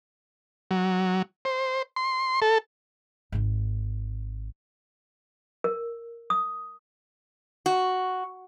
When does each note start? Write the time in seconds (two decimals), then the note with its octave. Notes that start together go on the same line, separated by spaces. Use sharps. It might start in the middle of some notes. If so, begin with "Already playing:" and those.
0.71 F#3
1.45 C5
1.96 C6
2.42 A4
3.32 G#1 D#3
5.64 A#4
6.30 D#6
7.66 F#4